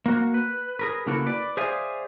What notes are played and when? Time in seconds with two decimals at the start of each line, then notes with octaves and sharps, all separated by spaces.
0.06 A#3 F#4
0.34 B4
0.79 G#4 A#4 B4
1.06 C#3 A#3 E4 F#4 A4
1.26 B4 D5
1.57 G#4 C5 D5 E5 F5 G#5